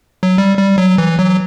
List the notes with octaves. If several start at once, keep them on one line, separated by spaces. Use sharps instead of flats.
F#3
G3
G3
F#3
E3
F#3